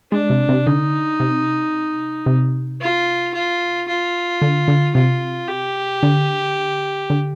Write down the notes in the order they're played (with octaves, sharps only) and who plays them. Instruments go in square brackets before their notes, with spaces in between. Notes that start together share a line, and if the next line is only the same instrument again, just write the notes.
[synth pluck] G#3 [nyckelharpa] D4
[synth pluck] C3
C3
[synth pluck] D3 [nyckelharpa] D#4
[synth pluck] C3
C3
[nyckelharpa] F4
F4
F4
[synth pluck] D3
D3
[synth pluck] C3 [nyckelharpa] F4
[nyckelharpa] G4
[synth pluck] D3
D3